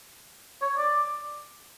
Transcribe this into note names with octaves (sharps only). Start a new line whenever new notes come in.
C#5
D5